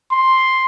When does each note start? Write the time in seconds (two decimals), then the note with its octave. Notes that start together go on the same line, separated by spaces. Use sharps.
0.12 C6